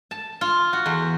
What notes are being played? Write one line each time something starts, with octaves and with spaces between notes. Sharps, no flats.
A5
F4
F#4
E2